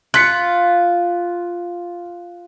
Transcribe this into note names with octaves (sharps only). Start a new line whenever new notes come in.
F4 F#6 B6 C#7